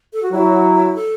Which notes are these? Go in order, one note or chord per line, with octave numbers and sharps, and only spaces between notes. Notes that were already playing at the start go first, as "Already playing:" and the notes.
A4
F#4
F#3 E4
A4